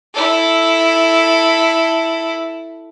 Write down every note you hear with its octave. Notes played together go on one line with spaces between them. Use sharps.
E4 A4